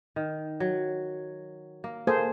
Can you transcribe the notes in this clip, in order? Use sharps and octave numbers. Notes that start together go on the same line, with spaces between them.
D#3
F#3
A#3
A#3 G#4 A4 C5